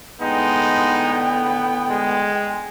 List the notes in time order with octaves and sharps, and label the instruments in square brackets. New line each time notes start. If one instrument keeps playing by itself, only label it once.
[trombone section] A2 D3 B3 [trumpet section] G#3 D#4 [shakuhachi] G5
[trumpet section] G#3